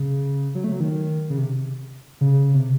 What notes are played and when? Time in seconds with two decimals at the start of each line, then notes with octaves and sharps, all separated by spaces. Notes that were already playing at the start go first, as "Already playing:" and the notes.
Already playing: C#3
0.55 F#3
0.64 A3
0.72 F#3
0.80 D#3
1.30 C#3
1.38 C3
2.21 C#3
2.54 C3